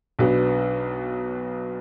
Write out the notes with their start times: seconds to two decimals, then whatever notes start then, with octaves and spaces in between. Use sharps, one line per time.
0.19 B1 B2 F#3 B3 D4